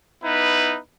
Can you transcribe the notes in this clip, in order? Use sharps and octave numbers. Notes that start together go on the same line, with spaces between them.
B3 D#4 E4 B4